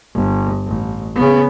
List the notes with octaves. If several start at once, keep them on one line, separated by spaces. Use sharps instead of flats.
G1
A1
C#3 B3